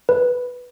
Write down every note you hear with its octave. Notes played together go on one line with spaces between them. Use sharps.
B4